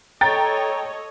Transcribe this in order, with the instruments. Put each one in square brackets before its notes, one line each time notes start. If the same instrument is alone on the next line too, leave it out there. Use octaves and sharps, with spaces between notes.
[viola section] A4 C#5 D#5 [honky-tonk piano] G5 A#5 A6